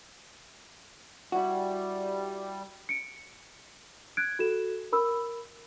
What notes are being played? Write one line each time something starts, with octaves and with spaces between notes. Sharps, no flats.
G3 E4 F#4
C#7 D7
F#6 G#6 D7
F#4 A4 E7
A#4 B5 E6